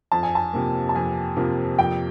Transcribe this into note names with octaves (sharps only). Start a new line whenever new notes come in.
F2 A5
G#5
A5
C3 F3 A#3
A5
F2 G#5
C3 F3 A#3
F2 G5